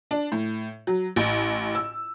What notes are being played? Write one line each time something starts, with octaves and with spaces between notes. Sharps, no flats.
D4
A2
F#3
A1
E6